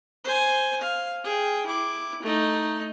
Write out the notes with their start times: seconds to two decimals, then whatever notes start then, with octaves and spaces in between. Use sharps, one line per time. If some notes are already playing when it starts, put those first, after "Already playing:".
0.24 C5 G#5
0.81 F5
1.24 G#4 G5
1.66 E4 D6
2.23 A3 D#4